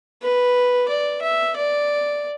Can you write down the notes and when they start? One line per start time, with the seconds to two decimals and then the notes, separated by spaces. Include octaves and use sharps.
0.22 B4
0.89 D5
1.22 E5
1.57 D5